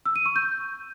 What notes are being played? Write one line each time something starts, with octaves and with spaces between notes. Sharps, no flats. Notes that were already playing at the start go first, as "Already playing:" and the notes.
E6
D#7
C#6
G6